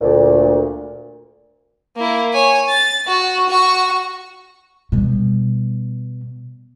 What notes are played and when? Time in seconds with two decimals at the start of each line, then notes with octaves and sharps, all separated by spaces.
0.01 D2 A#2
1.96 A#3 E4
2.33 C#5 G#5
2.69 A6
3.07 F#4
3.49 F#4 C#6
4.92 B2 G3